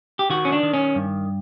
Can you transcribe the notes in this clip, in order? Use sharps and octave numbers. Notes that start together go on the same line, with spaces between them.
G4
D#3 F#4
C#4
D4
D#3
C#4
G2